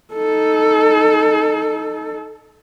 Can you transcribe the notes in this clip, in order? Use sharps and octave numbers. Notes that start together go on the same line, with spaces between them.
D#4 A4